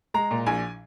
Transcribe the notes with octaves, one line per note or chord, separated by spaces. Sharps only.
G#3 A#5
A#2
A#1 G#5